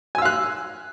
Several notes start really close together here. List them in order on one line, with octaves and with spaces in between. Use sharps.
G#5 E6 F5 F#6